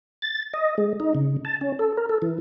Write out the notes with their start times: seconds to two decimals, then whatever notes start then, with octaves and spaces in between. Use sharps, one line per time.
0.22 A6
0.54 D#5
0.78 G#3
1.00 D#4
1.15 C#3
1.45 A5
1.61 C#4
1.79 A4
1.97 A#4
2.09 A4
2.22 E3